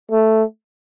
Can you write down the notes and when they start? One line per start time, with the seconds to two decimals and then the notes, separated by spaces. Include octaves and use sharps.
0.11 A3